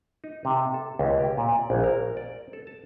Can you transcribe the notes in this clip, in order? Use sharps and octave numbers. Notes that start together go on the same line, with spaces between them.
D#4
C3
A4
C#2
G4
A#2
D5
A#1
A#4
D5
A4
A5